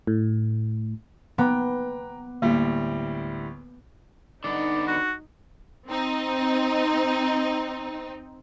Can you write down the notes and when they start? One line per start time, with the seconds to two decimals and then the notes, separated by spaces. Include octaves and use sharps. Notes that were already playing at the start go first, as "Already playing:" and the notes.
0.07 A2
1.38 B3 G5 A#5 D6
2.42 D2 A2 G3 A#3
4.44 D3 B3 D#4 D5
4.87 F#4
5.88 C4 D#4